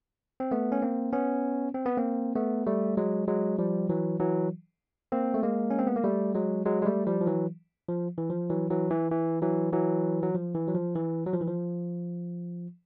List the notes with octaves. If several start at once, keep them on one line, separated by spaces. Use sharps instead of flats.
C4
A3 B3
C#4
A#3 C4
B3 C#4
C4
B3
A#3 C4
A3 B3
G3 A3
F#3 G#3
F#3 G#3
F3 G3
E3 F#3
E3 F#3
A#3 C4
A3
G#3 A#3
C#4
C4
B3
A#3
G3 A3
F#3 G#3
F#3 G#3
G#3
G3 A3
F3 G3
F3
E3 F#3
F3
E3
F3
E3 F#3
E3 F#3
E3
E3
E3 F#3
E3 F#3
F#3
F3
E3
F#3
F3
E3
F#3
F3
E3
F3